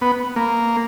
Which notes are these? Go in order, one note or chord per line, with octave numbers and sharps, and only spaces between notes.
B3
A#3